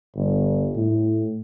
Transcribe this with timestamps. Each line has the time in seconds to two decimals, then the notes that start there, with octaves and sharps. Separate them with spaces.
0.15 G1
0.75 A2